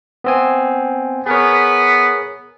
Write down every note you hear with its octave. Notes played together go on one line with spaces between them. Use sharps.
B3 C4 G#5
B3 G#4 A#4 C#5